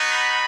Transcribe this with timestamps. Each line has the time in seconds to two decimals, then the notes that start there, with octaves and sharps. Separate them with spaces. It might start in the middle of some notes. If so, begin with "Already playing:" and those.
Already playing: B3 D#4 F#4
0.08 B5